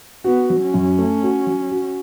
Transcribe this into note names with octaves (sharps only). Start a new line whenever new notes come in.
B3 F#4
F#3
C#4
F#2
A3
F#4
F#3
F#4